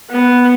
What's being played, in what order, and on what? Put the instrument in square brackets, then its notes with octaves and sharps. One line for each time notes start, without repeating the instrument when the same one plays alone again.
[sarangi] B3